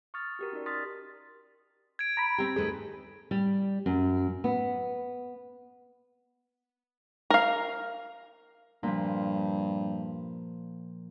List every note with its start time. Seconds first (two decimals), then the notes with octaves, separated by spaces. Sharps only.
0.14 C#6 D#6 F6 A6
0.39 F#4 G4 A#4
0.52 C#4 D#4 G4 A#4 D5
0.66 C6 D#6 F6 A6 B6
1.99 G#6 D7
2.17 A#5 B5 D7
2.38 C4 G4
2.56 D#2 A3 G#4 B4
3.31 G3
3.86 F#2
4.44 B3
7.30 A#4 F5
8.83 G2 A#2 F3